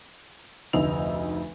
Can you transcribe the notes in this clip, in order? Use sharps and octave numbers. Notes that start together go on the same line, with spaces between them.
F1 D2 D#4 D#5 E6 F7